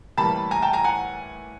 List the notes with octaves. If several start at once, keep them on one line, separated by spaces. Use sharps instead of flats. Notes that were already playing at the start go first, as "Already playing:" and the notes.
A2 E3 G3 A#3 A5 B5
G#5 A#5
G5 A5
G#5 A#5
F#5 G#5